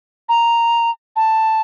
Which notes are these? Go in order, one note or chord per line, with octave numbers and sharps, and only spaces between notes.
A#5
A5